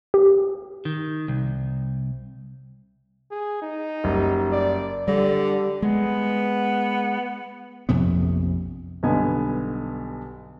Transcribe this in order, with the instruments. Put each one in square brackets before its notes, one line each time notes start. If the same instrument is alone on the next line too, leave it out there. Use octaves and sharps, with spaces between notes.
[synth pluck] G4
[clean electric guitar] D#3
C2
[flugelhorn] G#4
D#4
[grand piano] F#1 G3
[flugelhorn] D5
[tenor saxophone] D3 [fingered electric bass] G3
[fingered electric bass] G#3 [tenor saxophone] B3
[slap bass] A#1 F2 C3 B3
[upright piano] B1 G2 D3 B3 G#5